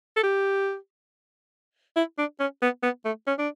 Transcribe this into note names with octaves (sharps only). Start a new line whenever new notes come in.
A4
G4
E4
D4
C#4
B3
B3
A3
C#4
D4